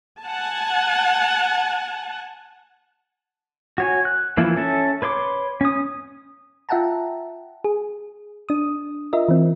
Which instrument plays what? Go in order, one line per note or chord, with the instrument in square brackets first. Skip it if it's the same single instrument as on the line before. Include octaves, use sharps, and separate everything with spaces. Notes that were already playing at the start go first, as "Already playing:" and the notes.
[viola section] F#5 G#5 A5
[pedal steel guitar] F#4 C#5 G#5
F#6
E3 F3 A#3 E4
C#4 A4 E5
B4 C#5 C6 D6
C#4 D#6
[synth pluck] F4 E5 F#5 G5 A5 A#5
G#4
D4 D#6
F4 A#4 D#5 E5
E3 C4